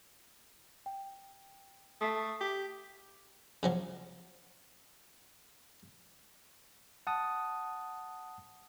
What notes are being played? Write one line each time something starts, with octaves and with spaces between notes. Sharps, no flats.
G5
A3 D#6 B6 C7
G4 B6
C#3 F3 F#3
F#5 A5 D#6